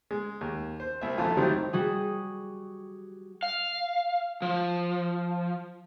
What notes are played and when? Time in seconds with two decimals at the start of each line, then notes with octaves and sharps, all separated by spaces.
0.11 G#3
0.41 D#2
0.80 C5
1.01 C2 E5
1.18 A#1 F2 A3 F4 G#5
1.37 D#3 F#3 G3 C4 D#4 E4
1.73 G3 F#4 G#4
3.43 F5
4.42 F3